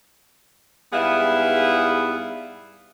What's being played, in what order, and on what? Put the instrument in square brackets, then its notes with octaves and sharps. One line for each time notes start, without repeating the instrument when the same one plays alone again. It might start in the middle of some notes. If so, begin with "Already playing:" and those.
[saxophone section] G#2 G3 B3 E4 G#4 F5